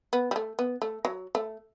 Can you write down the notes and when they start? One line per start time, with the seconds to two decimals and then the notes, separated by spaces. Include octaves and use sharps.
0.13 B3
0.31 G3
0.36 A3
0.59 B3
0.82 A3
1.05 F#3
1.35 A3